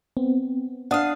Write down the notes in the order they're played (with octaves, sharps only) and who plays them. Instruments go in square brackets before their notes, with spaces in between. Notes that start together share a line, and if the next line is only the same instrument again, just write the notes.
[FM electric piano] B3 C4
[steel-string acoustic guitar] D4 F5 [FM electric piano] F#5 D#6